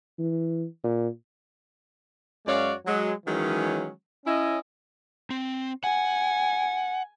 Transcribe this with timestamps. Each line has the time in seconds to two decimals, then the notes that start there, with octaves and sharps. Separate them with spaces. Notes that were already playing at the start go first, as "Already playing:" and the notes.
0.19 E3
0.84 A#2
2.46 F#2 G#3 F#4 C#5 D5 F5
2.86 F#3 G#3
3.26 D#3 E3 F#3 G#3 C#4
4.25 C#4 E4 D#5
5.30 C4
5.84 F#5 G#5